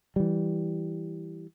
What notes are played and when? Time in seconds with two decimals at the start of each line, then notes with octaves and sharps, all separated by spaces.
0.16 E3 G3